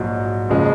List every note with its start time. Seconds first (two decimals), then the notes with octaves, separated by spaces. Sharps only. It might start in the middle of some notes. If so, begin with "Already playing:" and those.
Already playing: A#1 G#2 F#3
0.50 F#1 C#3 F3 G#3